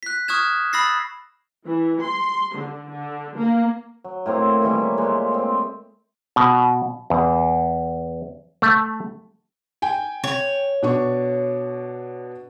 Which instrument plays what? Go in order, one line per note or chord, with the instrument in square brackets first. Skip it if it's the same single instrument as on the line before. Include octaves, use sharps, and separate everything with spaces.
[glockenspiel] F#6 B6
C#6 D#6 F6 F#6 G#6 E7
B5 D#6 E6 A6 A#6 C7
[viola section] E3
C6
D3
D3
A#3
[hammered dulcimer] F#3
A2 A#3 C4 D6
D#3 E3 G3 C#5
E5
A#2 G#3 A3
C4
[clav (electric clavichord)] B2
E2
A3
[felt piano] G5 G#5
[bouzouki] C#5
[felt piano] B2 D4 C#6